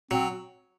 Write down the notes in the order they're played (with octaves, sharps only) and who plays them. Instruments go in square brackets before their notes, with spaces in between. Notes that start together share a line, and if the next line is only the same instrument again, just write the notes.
[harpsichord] F#3 [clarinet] C4